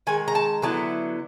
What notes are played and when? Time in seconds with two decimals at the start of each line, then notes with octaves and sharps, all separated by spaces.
0.07 D#3 G#3 G#5
0.28 A#5
0.35 A5
0.62 D3 F#3 B3 E4 A5